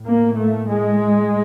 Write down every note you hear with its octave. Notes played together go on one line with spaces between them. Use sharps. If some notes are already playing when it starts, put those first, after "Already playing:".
Already playing: A2
A#3
A3
G#3